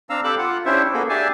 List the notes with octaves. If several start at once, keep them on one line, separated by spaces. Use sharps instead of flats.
C4 D4 F5 A#5 E6
G4 A4 B5 D6 E6 F#6
F4 F#5
C#4 D4 E4 G4 C5 E5
A#3 B3 F#4 G#4 A4
D4 G4 G#4 E5 G#5 A5